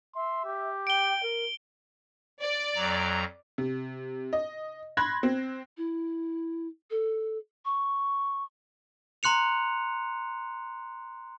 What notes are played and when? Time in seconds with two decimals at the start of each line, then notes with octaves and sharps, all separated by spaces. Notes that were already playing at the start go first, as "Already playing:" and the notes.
0.15 E5 C6
0.45 G4
0.87 G5 D7 G7
1.22 A#4
2.41 D5
2.76 F2 F#3 A#5
3.58 C3
4.33 D#5
4.97 B5 C6 F#6 G#6 A#6
5.23 C4
5.77 E4
6.90 A4
7.65 C#6
9.23 A#5 C6 F#6 C#7 F7